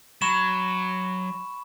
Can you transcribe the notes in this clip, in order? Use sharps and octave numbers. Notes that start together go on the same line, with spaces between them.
F#3 B5 C#6 E7